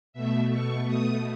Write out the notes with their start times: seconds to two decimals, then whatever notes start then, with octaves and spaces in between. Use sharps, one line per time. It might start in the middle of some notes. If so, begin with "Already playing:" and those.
0.13 B2 A3 E5
0.51 C#6
0.87 D#6